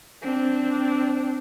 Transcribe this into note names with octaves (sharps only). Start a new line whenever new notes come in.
C4 D4